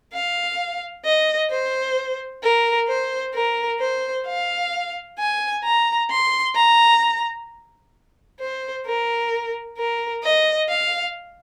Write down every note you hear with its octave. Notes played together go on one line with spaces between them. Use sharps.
F5
D#5
C5
A#4
C5
A#4
C5
F5
G#5
A#5
C6
A#5
C5
A#4
A#4
D#5
F5